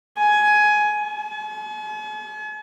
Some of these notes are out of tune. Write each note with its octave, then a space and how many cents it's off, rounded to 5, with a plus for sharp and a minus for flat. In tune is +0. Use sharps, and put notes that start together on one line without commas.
G#5 +15
G#5 +45